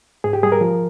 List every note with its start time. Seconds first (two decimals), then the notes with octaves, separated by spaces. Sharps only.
0.24 G#2 G#4
0.33 G4
0.43 G3 G#4
0.52 A#4
0.61 F3